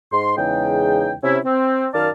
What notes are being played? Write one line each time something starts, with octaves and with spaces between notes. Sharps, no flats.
G#2 C6
E2 C#3 G#3 D#4 G5
C3 C#4 E4
C4
F#2 D#3 D5 F5 A5 F6